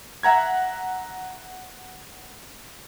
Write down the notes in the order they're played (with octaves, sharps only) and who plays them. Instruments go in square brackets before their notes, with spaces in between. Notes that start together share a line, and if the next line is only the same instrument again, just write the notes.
[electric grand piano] E5 F#5 A#5 G#6